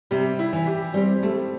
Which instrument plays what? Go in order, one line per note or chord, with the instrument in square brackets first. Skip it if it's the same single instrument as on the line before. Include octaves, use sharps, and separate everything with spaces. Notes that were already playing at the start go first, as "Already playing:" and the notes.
[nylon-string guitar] C3 [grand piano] G3
[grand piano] E4
[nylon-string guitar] E3
[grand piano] G4
[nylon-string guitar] G3 [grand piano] C4
[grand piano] G3 [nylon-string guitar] A3